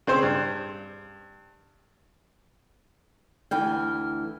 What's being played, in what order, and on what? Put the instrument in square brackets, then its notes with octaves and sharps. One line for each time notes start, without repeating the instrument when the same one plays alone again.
[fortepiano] C#3 C4 C5
G2
[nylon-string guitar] D2 E3 G5 [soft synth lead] F6